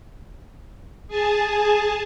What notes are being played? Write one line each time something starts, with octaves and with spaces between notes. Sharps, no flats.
G#4 G#5 A5